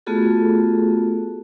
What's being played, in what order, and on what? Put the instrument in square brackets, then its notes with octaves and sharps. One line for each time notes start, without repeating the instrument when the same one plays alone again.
[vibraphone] A3 B3 F4 F#4 G#4 A4